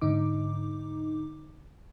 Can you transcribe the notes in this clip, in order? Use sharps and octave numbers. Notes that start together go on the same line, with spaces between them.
G#2 D3 D#4 D6